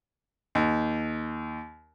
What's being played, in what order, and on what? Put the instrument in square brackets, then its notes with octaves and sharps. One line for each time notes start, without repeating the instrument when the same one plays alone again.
[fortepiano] D#2